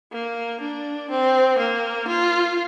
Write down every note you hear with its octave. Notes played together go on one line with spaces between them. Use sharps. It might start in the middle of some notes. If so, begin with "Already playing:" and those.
A#3
D4
C4
A#3
F4